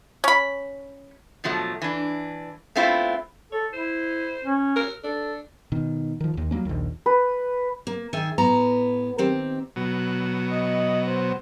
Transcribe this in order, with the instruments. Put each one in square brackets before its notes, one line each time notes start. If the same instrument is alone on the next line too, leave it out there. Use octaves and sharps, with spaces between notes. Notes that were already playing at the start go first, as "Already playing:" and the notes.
[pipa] C#4 B5
[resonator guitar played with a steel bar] B2 F3 F#3 A3
E3 D4
A3 B3 C4 E4 F4
[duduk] A4 [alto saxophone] C#5
[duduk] E4 [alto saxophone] C5
[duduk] C#4
[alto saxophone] A#4
[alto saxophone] D4 [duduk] A4
[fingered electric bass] B2 D#3
D#3 F3
E1 D#2
F#3 G3 A#3 C#4
A#1 D#2
[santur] B4
[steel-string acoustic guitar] A#3
D#3 D#4 G#4 E5 G#5
A2 B3 A#5
D#3 C4 G4
[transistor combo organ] B2 F#3
[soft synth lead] D#5
C5